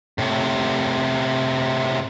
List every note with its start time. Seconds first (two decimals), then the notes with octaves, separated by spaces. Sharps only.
0.18 A2 C3